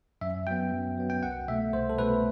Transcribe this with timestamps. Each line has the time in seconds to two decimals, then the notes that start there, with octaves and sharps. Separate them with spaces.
0.21 F#2 E5
0.47 F#3 B3 G5
0.72 F#2
0.97 F#3 B3
1.10 G5
1.22 C2 F#5
1.48 B2 A3 E5
1.73 C2 C5
1.90 A4
1.98 B2 A3 B4